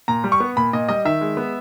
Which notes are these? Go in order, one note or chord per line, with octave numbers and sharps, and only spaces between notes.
A#2 A#5
G3
C#6
B3
A#2 B5
A#2 D#5
G3 D#5
D#3 E5
G#3
B3